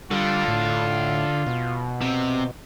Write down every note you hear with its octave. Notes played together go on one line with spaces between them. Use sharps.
D3 G3 F4
A2
B2
C3